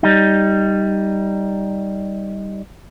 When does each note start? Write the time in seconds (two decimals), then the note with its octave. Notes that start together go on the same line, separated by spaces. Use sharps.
0.03 G3 D#4